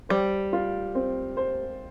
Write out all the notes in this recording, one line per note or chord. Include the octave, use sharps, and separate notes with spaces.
G3 C5
F4
C4
C5